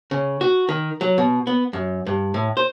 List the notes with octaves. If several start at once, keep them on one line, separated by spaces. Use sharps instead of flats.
C#3
F#4
D#3
F#3
B2
B3
F#2
G2
A2
C5